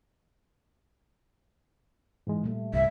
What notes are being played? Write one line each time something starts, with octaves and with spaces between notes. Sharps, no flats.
G#2 E3 G#3
A#2 G3 A3
C2 G2 E5